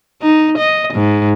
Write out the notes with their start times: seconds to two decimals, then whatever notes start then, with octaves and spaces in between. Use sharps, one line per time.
0.22 D#4
0.57 D#5
0.93 G#2